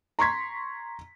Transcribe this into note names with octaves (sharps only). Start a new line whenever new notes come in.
A#5 C6 C#6 G#6 B6